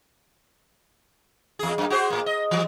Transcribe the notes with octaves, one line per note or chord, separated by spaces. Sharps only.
E2 G#4
F#2 A#3
F#4 G#4 C5
A2 A#3
D#5
E3 G3